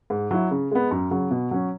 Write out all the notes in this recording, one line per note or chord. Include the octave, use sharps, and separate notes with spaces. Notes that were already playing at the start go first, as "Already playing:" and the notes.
G#2
F#3 E4
C#3
G#3 B3
F#2
C#3 F#3
B2
F#3 C#4